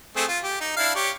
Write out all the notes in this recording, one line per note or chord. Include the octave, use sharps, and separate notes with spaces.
A3 C4 G#4
F4
G4
D#4
D4 E4 F5
G4 C#5